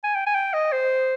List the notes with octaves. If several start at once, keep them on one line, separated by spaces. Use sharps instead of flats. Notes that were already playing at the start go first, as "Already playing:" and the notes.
G#5
G5
G#5
G5
D#5
C5